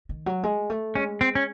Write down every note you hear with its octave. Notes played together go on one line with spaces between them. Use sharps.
D#3
F#3
G#3
A3
G#3 C#4
C4
C#4